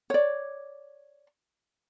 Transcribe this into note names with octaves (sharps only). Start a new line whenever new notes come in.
C#5 D5